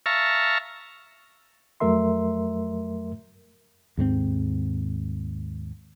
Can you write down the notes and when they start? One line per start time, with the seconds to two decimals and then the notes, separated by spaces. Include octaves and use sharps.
0.06 E5 F5 A5 A#5 C#6
1.80 F2 F#3 A3 A#4 E5 C6
3.97 D#2 G#2 G#3 C4